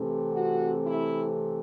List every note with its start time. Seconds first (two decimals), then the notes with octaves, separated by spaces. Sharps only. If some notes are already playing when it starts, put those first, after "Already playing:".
Already playing: C3 E3 A3 C4
0.32 F#4
0.85 E4